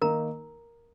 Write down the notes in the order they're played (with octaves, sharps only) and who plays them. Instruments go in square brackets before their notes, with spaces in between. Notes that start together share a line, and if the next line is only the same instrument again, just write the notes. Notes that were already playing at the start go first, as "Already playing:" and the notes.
[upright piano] D#3 A#3 D#4 [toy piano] A#4 A#5